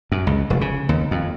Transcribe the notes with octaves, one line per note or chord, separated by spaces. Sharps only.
F#2
C#2
F1
C#3
D#2
F2